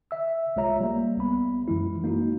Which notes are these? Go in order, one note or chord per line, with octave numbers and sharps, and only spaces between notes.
E5 E6
C2 G#3 F4 C#5 E5 A#5
G3 A#3
C2 B3 B5
F#2 E3 G#3 E4
G#3 A#3 D#4 E4 F#4